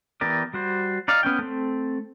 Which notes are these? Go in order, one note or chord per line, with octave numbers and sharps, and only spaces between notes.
E3 B3 G4 A#4 D5
G3 F#4 C5
D#4 D5 F5
B3 C#4 G5
A3 C4